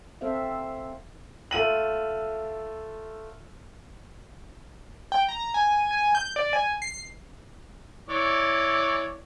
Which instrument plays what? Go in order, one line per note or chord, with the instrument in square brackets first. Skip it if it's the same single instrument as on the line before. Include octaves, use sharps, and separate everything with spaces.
[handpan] C4 A4 C5 E5 F5
[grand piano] A3 F4 D#7 F#7
[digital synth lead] G5
A#5
G#5
G#5
G6
D5
G#5
C7
[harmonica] E3 C#5 D5